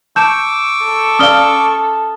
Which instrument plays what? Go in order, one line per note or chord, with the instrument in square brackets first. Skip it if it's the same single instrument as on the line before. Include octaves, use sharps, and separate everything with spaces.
[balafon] A5 [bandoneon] C#6 D6 E6 [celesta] G6 E7
[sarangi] A4
[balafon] C#4 D5 F5 [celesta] D#6 F6 G7